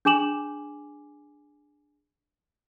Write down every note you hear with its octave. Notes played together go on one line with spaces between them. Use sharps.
D4 G#4 G#5 D6 E7 F#7